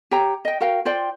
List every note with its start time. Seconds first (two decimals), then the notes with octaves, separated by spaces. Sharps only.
0.11 G4 C#5 G5 A#5
0.45 D#5 G5
0.60 F#4 A#4 F5 G5
0.85 F4 C5 D5 G5